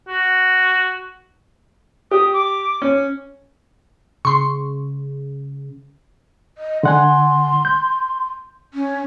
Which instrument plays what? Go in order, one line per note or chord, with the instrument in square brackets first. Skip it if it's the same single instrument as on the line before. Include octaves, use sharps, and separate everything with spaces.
[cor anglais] F#4
[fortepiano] G4 [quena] D#6
[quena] D6
[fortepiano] C#4
[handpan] C#3 [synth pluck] C6 C#6
[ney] D#5
[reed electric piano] D3 F#5 G#5 [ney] C6
[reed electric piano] G6
[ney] C#4